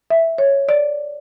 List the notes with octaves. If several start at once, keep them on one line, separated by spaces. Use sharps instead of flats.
E5
C#5
D5